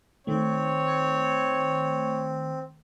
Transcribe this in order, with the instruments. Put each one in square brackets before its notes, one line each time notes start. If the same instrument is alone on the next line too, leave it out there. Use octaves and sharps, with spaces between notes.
[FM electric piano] D#3 A3 [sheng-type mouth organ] C4 [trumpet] C#5